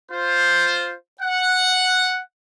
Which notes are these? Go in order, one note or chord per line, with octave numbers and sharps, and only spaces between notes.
F4 C5
F#5